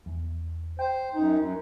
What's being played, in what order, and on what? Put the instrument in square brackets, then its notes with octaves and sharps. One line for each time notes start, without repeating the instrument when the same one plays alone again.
[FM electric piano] E2
[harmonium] C5 [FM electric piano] G5
[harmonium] F#2 D#4
F#2